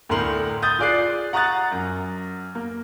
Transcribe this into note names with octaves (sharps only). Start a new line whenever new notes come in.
D2 A2 A#4 C6 F#7
D#6 G6 A6
F4 G#4 D5 D6 F#6 C7
F#5 A#5 C#6 D#6 F#6 A6
F#2
A#3